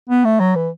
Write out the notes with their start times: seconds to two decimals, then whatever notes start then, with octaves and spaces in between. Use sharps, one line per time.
0.10 B3
0.25 A3
0.40 F#3
0.55 E3